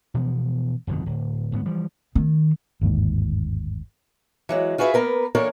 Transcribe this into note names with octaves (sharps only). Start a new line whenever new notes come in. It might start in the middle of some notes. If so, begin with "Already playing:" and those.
B2 E3 F3 B3
G1 F2 B2 D#3
D1
D1 G#2 A3 B3
E3 F3 G3
D#3
G1 D#2 G#2
E3 F#3 G#3
F4 F#4 G#4 B4 D#5 E5
A#3 B3 A#4 B4
E3 A#3 D4 A4 A#4 C#5